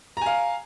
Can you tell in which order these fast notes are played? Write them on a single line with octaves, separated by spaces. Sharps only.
A#5 G#5 F5